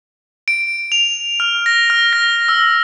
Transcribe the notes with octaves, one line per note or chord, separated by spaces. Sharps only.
D7
F7
F6
A#6
F6
A#6
E6